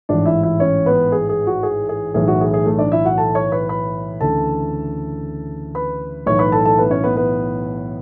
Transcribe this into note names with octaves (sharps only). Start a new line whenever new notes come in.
A1 G#2 E3 D4 D5
E4 E5
E4 E5
C#4 C#5
B3 B4
G#4
G#4
F#4
G#4
G#4
B1 A2 E3 G#4
F#4
G#4
G#4
A3 A4
D4 D5
E4 E5
F#4 F#5
A4 A5
C#5 C#6
B4 B5
B4 B5
D2 C#3 E3 A4 A5
B4 B5
B1 A2 E3 C#5 C#6
B4 B5
A4 A5
A4 A5
B3 B4
C#4 C#5
B3 B4
B3 B4